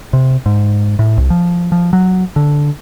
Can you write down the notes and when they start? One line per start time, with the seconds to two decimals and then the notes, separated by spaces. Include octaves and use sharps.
0.13 C3
0.46 G#2
0.99 A2
1.18 C2
1.30 F3
1.72 F3
1.93 F#3
2.36 D3